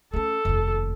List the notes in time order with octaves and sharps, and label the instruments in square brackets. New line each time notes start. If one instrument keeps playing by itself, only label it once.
[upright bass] A3 C#4 [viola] A4
[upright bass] F1 D#2